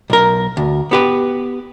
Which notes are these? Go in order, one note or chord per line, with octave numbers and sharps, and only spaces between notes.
B1 A#4
D2
B3 G4 B4